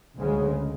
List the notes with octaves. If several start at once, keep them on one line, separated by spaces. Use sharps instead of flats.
D2 C#3 G#3